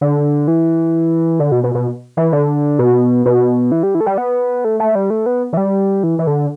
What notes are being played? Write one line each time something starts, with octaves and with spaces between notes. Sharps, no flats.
D3
E3
D3
B2
B2
B2
E3
D3
B2
B2
E3
G3
E3
A3
G3
B3
A3
A3
G3
A3
B3
E3
G3
E3
E3
D3